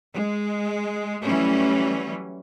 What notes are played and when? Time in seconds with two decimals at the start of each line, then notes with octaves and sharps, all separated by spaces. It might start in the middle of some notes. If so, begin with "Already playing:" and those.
0.15 G#3
1.23 E3 F#3 G3 A3 C#4